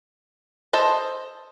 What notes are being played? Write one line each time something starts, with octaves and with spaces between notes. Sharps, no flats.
A4 C5 D#5 A5